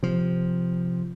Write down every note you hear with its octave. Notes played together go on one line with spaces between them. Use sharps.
C3 F3